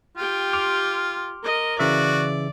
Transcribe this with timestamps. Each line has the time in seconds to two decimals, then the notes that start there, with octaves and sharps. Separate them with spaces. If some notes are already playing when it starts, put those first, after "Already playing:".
0.17 F4 G4 G5
0.53 C6 D6 F6
1.44 A#4 D#5
1.79 C#3 E3 F#4 D5 E5